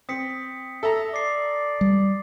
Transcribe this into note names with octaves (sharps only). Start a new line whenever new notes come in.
C4 D#6 B6 C#7
A4 E5 A#5
D5 D6 C7
G3